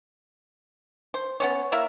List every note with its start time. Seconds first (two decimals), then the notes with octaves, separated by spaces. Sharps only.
1.14 C5
1.40 B3 C#4 C#5
1.72 A#3 E4 A#4 E5